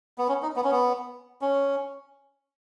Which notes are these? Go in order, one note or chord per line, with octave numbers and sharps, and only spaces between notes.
B3
C#4
D#4
B3
C#4
B3
C#4